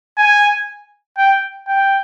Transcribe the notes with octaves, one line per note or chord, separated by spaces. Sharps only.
G#5
G5
G5